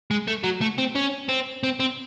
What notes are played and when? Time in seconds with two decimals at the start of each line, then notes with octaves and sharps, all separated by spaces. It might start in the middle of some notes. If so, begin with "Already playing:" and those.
0.11 G#3
0.28 A3
0.44 F#3
0.61 A3
0.78 C4
0.95 C#4
1.29 C4
1.63 C4
1.80 C4